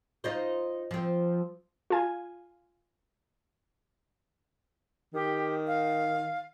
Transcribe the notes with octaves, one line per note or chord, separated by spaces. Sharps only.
D#4 F4 C5
F3 C4
F4 G#5
D#3 G4
F5